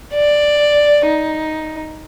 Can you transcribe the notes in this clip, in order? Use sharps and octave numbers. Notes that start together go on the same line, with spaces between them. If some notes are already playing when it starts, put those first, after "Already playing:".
D5
D#4